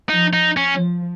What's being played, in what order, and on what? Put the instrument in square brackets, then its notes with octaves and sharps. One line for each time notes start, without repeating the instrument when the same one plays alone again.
[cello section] F3 [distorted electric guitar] D#4
[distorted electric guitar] D#4
C#4
[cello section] F3